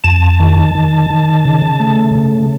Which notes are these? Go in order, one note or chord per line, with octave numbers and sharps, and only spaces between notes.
F2 A5
D#3
D#3
D#3
C#3
A3
C#3